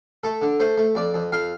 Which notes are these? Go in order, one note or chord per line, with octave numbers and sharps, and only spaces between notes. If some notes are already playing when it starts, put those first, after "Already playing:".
A3 A4
D3
A3 C5
A3
F2 D5
F2
F2 F5